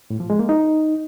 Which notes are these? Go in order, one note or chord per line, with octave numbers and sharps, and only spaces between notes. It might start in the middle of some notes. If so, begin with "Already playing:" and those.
A2
F3
G#3
A#3
D#4